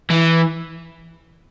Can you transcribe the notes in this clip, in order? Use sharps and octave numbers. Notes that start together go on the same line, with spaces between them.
E3